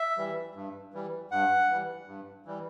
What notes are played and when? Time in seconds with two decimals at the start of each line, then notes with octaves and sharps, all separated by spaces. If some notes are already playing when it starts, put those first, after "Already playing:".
Already playing: E5
0.17 E3 G3
0.55 G2
0.94 E3 G3
1.31 G2 F#5
1.69 E3 G3
2.07 G2
2.46 E3 G3